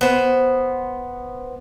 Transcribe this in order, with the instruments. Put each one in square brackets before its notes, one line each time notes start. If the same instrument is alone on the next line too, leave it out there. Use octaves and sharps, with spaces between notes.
[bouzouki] B3 C5